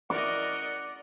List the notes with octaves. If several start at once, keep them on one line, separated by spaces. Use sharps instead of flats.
A#4 D5 D#5 F#5 D6